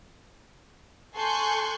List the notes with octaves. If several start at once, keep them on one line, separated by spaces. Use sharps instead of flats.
A4 G#5 C6 C#6 F#6 G6